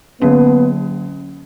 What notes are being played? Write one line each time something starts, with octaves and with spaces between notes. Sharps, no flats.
D3 F#3 A#3 B3 C#4